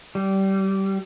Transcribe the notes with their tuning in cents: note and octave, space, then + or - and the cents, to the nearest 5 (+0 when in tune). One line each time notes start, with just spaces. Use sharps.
G3 -20